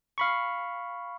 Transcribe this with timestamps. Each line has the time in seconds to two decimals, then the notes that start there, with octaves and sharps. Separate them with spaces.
0.18 F5 B5 C#6